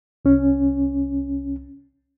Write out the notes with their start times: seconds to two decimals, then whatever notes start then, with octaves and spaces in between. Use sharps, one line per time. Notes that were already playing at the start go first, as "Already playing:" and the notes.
0.25 C2 C#4